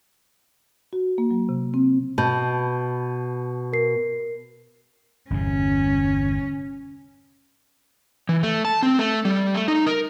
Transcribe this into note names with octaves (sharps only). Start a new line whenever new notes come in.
F#4
A#3
F#3
C3
C4
B2 A5 B5 G6
A#4 C7
G1 E2 C3 C#4
E3
A3
A5
C4
A3
G3
A3
D#4
A#4